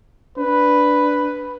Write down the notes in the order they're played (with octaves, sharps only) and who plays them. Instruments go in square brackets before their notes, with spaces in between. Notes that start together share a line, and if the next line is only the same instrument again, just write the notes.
[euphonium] D4 [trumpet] B4